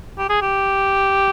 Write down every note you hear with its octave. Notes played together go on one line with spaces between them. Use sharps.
G4
G#4
G4